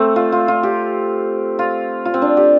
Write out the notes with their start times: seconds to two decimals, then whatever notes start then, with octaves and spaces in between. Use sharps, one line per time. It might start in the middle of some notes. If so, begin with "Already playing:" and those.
Already playing: A3 C4
0.16 F4
0.32 F4
0.48 F4
0.63 G4
1.59 F4
2.05 F4
2.14 C4
2.22 D4
2.37 G4